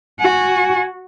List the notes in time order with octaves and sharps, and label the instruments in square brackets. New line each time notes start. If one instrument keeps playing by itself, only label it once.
[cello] F#4 [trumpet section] G#5